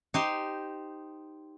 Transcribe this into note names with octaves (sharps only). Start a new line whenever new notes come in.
D#4 G4 C5